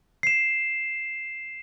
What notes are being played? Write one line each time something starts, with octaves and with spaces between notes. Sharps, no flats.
C7 E7